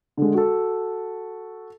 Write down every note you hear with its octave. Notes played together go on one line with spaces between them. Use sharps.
D3 G#3
F#4 A4